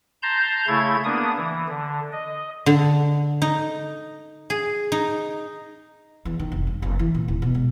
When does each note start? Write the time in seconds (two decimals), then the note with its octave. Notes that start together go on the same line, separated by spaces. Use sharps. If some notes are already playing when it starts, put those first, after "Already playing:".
0.22 A5 A#5 C6 G6
0.68 C#3 A3 E4 G#6
1.05 A#3 B3 D4 D#6
1.37 E3
1.68 D3
2.12 D#5
2.66 D3
3.42 D#4
4.50 G#4
4.92 D#4
6.25 E2
6.39 D#3
6.52 F1
6.67 G2
6.82 F#1
6.99 E3
7.14 A#2
7.28 D#1
7.42 B2
7.55 G#3